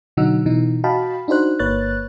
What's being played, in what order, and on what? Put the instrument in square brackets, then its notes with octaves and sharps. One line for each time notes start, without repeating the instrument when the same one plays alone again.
[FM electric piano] B2 D3 F#3 D#4 F#5 E6
B2 E3 D#4
F#4 D#5 F5 G5 A5 B5
D4 D#4 F#4 C5 F#6
G1 A#3 B4 C#5 F#6 A6